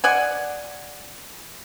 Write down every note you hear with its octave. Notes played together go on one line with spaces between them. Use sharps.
D5 F#5 G#5